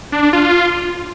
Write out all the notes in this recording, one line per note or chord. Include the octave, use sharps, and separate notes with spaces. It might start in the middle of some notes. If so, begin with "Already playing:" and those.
D4
D4
F4